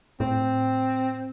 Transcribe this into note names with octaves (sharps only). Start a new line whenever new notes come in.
A2 C4